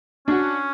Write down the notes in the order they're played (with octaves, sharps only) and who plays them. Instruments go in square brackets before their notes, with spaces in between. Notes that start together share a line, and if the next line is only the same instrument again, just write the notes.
[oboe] C#4 [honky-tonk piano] D4 F#4